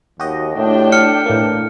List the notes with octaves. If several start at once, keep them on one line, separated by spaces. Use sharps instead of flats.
D#2 F#4 G4 D#5
A2 D4 G5
F6 C#7
A2 E3 A#3 E4